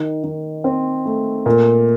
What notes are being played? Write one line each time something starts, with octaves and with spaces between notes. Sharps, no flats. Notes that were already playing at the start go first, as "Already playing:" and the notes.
Already playing: D#3
D#3
C4
A3
A#2